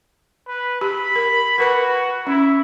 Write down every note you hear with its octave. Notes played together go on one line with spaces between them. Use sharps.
B4
G4 B5
A#4
F#4 A#4 B4 B5
C#4 E4